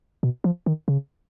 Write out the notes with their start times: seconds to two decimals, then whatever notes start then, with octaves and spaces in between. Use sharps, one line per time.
0.23 B2
0.44 F3
0.66 D#3
0.88 C#3